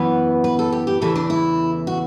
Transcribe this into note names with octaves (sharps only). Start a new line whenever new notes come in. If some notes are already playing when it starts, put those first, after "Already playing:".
Already playing: F#2 E3 B3 B4
B4
A4
G4
G4
E2 C#3 E3 A3 A4
D4
E4
F#4